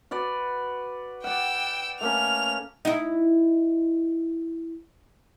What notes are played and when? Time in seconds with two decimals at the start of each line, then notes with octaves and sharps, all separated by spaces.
0.11 F#4 B4 D5
1.24 D5 F#5 G5 E6
2.01 A3 A#3 C#4 F7
2.85 D#4 E4